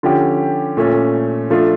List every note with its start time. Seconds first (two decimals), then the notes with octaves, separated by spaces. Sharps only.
0.03 D3 F3 C#4 G4
0.77 A#2 A3 C#4
1.50 F3 A3 D4 F4